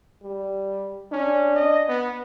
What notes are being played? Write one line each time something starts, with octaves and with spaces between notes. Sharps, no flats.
G3
C#4 D4
D#5
B3